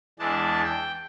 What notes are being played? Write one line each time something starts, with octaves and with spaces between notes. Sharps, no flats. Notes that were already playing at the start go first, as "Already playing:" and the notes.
E2 E3 G#3 D4 A5
G5